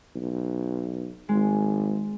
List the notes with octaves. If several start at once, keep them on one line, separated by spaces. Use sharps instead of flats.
B1
G#1 G#3